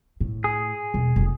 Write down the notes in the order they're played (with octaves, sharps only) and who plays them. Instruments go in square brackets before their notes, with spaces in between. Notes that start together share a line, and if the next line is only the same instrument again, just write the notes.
[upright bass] A2
[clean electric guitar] G#4
[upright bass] E1
F1 F2